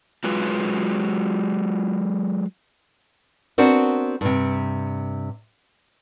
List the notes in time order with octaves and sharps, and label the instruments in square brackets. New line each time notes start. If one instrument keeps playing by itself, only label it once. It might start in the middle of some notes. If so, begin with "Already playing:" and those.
[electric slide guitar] F#3 G#3 F4 B4
[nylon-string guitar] B3 C4 D4 F#4 A#4 C5
G2 C3